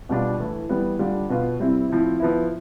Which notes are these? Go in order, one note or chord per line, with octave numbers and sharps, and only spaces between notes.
B2 G3 D4 F4
A2 E3 A3
E3 G3 B3
D3 G3 D4 F4
B2 B3 F4
C3 G3 C4 E4
A2 F3 C4 E4
F3 B3 E4